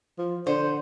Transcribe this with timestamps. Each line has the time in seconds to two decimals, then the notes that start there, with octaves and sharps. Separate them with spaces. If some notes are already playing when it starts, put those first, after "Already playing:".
0.18 F3
0.47 D3 C5